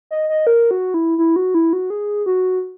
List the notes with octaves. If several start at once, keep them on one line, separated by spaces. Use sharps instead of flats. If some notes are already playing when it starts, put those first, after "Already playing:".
D#5
D#5
A#4
F#4
E4
E4
F#4
E4
F#4
G#4
F#4